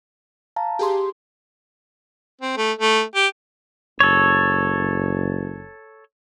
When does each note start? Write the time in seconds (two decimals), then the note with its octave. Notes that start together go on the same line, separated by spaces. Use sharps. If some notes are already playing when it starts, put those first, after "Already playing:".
0.56 F5 A5 A#5
0.79 G4 G#4 C6
2.41 C4
2.57 A3
2.79 A3
3.15 G4
4.00 F#1 A4 C#5